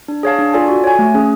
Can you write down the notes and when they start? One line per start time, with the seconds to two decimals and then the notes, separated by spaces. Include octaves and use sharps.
0.08 D4
0.23 G#4 C#5 F5 A5
0.39 D4
0.53 F4 A4 D5 G#5
0.68 F#4
0.84 C#5 G#5
0.99 A3
1.14 C#4 G#4